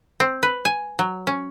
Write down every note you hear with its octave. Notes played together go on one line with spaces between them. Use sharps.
C4
B4
G#5
F#3
C#4